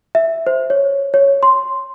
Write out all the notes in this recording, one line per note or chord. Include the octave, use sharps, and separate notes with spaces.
E5
C5
C#5
C#5
C6